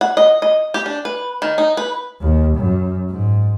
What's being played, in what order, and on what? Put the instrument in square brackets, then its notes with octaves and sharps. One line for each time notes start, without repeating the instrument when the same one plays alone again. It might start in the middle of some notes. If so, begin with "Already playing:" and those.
[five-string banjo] F#5
D#5
D#5
G4
D4
B4
D#3
D#4
B4
[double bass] D#2
F#2
G#2